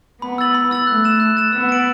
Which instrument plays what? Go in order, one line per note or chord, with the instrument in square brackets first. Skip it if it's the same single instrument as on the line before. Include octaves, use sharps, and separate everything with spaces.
[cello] B3 [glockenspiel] B5
[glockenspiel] E6 A6 F#7
B5
E6 A6 F#7
[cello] A3 [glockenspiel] F#6
[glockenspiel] A6 E7
F#6
A6 E7
[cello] B3 [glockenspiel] E6
[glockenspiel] A6 D7 F#7